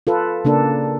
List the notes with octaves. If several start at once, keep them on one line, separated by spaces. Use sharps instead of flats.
F4 A4 B4
C#3 A#3 D4 A4